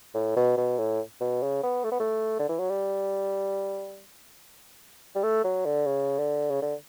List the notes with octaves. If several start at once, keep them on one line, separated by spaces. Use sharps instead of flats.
A2
B2
B2
A2
B2
C#3
B3
A3
B3
A3
D3
E3
F#3
G3
G3
A3
F#3
D3
C#3
D3
C#3
D3